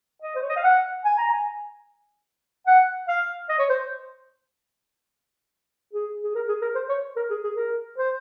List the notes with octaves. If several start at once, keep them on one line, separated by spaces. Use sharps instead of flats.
D#5
C5
C#5
D#5
F5
F#5
G#5
A#5
G#5
F#5
F5
D#5
C#5
C5
G#4
G#4
A#4
G#4
A#4
C5
C#5
A#4
G#4
G#4
A#4
C5